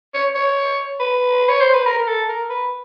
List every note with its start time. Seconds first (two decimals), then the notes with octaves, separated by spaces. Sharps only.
0.14 C#5
0.35 C#5
1.00 B4
1.48 C#5
1.61 C5
1.74 B4
1.86 A#4
1.98 A#4
2.07 A4
2.29 A#4
2.50 B4